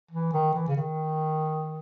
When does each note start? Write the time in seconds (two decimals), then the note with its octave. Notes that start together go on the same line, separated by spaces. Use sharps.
0.11 E3
0.33 D#3
0.54 E3
0.68 C#3
0.76 D#3